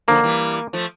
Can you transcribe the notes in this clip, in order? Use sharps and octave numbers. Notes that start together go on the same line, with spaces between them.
D3 F3 A#3
E3 G3
F3 A3